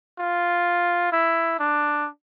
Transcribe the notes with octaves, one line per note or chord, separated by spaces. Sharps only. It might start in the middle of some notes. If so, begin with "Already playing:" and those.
F4
E4
D4